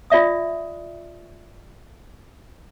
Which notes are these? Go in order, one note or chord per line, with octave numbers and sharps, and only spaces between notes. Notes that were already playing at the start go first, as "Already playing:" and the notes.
F4 D5 E5 D#6